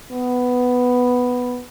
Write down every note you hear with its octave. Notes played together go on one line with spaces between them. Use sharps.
B3